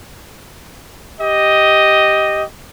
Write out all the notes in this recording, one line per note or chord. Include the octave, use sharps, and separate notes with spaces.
G4 D#5